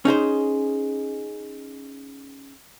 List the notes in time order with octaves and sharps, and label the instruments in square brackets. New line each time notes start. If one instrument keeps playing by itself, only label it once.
[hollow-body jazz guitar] C#4 D#4 G#4 C5